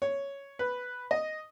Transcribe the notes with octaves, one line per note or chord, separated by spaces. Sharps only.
C#5
B4
D#5